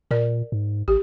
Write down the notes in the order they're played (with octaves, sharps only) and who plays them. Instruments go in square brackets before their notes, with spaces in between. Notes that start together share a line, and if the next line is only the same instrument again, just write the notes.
[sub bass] A#2 [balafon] A#4 D5
[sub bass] G#2
[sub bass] A1 [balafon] G4